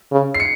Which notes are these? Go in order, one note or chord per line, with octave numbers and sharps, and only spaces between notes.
C#3
C7
C#7